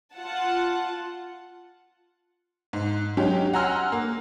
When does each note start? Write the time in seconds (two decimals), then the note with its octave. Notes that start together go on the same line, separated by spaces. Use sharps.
0.14 F4 F#5 A5
2.73 G#2
3.17 F#3 G#3 C#4 G4
3.53 F#5 G#5 A#5 C6 E6 F6
3.92 A#3